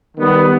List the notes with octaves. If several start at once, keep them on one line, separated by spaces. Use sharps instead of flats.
D#3 G3 B3